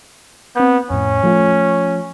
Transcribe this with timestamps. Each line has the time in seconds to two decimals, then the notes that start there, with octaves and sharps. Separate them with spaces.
0.56 B3 C4 G6
0.90 F2 A2 C#4
1.23 F3 A3 F4